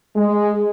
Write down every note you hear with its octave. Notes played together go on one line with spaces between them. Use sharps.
G#3